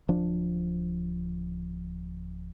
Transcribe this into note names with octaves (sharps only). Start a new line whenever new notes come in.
D1 F3 D4